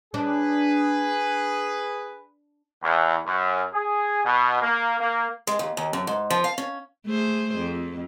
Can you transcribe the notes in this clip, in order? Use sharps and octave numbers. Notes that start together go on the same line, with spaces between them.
D4 G#4 B4
E2
F#2
G#4
B2
A#3
A#3
G#3
D#2
D#2
F#2
G#2
F3
F5
C#4
A3 G#4 C5
F2